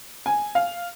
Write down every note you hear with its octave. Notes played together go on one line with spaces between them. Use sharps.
G#5
F5